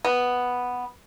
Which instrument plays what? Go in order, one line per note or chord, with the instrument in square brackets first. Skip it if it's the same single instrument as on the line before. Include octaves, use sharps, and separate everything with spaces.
[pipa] B3